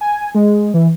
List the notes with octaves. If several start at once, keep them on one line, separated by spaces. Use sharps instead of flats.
G#5
G#3
E3